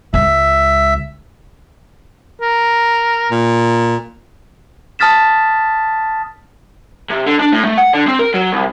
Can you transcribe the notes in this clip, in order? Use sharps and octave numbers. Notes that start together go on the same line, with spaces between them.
C#2 E5
A#4
A#2
A5 D#6 F6 A6 B6 E7
C3
D3
D4
A2
A3
F#5
D3
C4
A#4
F#3
C2